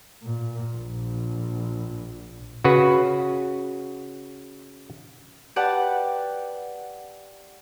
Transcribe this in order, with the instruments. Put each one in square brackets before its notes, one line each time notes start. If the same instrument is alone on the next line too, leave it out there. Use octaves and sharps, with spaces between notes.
[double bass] A#2
A#1
[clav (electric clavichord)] C#3 F#4 B4
[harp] G4 B4 D5 F#5 A5